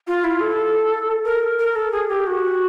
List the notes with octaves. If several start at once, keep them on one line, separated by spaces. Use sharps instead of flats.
F4
E4
A4
A#4
A#4
A4
G#4
G4
F#4